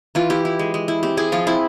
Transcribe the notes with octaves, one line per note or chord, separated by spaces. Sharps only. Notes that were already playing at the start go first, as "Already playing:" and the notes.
E3 F4
E4 G4
E4
G#3
G#3
E4
C4 G4
E4 G#4
F3 F4
C4 E4